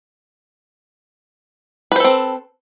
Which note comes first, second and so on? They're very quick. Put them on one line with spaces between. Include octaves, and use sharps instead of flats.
B4 C5 A4 C4